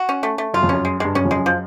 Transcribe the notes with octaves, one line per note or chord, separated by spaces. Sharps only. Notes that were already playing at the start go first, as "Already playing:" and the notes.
Already playing: F#4
C#4
A3
A3
F#2 F4
F2
F#2 C#4
G#3
G2 G#3
F#2 C#4
F2
F#2 G#3
F3